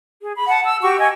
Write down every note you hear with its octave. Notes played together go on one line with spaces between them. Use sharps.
G#4
B5
F#5 A5
E6
F#4 G4 F#5 C#6
D#5 G#5